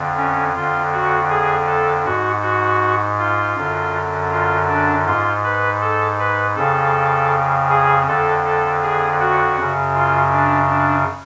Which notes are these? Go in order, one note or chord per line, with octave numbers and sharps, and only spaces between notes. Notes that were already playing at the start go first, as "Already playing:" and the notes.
Already playing: F2 D3
C#4
F2 D3 F4
F#4
G#4
A4
G#2 F#4
F#4
F4
F#2 D3
F4
D4
G#2 F4
B4
A4
B4
F2 C#3 A4
G#4
F2 D3 A4
A4
G#4
F#4
F#2 C#3
F4
D4
D4